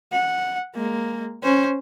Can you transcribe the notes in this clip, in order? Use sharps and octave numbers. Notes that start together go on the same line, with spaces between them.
F#5
G#3 A#3
C#4 C5